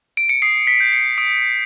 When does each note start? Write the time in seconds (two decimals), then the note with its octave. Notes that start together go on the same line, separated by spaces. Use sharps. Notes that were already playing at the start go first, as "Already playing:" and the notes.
0.17 D7
0.29 C#7
0.42 D#6 C7
0.67 B6
0.80 G6
0.93 C#7
1.18 D#6 D7